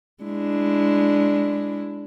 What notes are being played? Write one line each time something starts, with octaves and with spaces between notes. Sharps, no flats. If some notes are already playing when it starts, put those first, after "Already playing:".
G#3 D4 E4